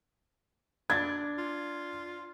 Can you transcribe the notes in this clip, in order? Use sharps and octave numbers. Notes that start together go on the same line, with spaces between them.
D4 G#6 A6
F4